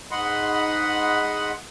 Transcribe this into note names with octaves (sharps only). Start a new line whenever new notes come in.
G#2 D#5 F#5 B5 C6